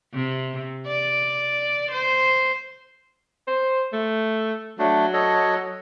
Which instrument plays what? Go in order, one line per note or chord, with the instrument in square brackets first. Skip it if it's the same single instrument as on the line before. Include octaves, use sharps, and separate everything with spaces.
[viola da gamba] C3
D5
C5
[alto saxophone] C5
A3
[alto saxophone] F#3 [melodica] A3 D4
[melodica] A4 C#5 D#5